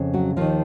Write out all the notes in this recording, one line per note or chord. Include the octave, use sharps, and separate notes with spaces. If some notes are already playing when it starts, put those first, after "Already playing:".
Already playing: F2 C#3
F#3 F#4
D#2 D#3 F3 F4